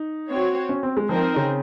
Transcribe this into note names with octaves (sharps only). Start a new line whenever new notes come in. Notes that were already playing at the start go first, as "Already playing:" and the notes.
Already playing: D#4
C4 F#4 C#5
C#4
C4
G#3
F3 C4 D#4 A#4
C#3